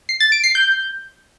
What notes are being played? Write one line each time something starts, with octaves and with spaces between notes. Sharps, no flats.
C7
A6
D7
C7
G6